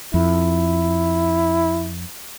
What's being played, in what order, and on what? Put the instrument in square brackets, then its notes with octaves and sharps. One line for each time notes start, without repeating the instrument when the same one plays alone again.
[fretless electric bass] F2 [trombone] E4